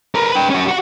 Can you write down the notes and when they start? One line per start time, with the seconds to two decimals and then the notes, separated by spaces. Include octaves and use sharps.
0.15 A#4 B4
0.32 B4 G5
0.50 C#4 F#4
0.68 F#4 F#5